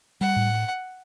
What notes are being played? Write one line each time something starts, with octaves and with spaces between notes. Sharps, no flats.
G3 F#5
A2